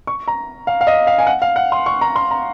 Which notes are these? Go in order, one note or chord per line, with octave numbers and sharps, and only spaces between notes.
C#6
A#5
F5
F5
D#5
F5
G#5
F#5
F5
F#5
C6
C#6
A#5
C6
A#5